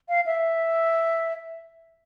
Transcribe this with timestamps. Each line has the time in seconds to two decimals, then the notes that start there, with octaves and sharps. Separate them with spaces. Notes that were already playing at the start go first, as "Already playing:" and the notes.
0.09 F5
0.26 E5